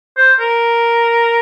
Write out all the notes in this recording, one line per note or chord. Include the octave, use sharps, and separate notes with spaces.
C5
A#4